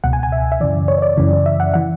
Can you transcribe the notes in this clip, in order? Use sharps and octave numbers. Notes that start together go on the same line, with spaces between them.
C#2 B2 F#5
G#5
G#5
E5
E5
F#2 C#3 E3 D5
C#5
C#5
D5
F#2 C#3 E3
E5
F#5
E3 F#5